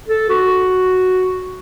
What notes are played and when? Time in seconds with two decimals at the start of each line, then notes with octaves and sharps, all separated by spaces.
0.08 A4
0.29 F#4